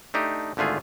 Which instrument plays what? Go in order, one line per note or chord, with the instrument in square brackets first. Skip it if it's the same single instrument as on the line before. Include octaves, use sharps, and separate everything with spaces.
[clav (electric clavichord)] A3 D4 D#4 G4
G#1 D3 A3 F4 G#4